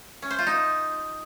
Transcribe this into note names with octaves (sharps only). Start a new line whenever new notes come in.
C#4
C5
F4
D#4